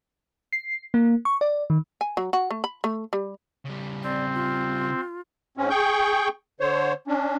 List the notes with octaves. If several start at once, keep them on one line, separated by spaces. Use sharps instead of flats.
C7
A#3
C#6
D5
D#3
G#5
F#3
F#4
A3
B5
A3
G3
C#3 G3
C4 D5
F4
G#2 C4 C#4
G#4 G5 C#6 G6
D3 C5 C#5
C#4 D4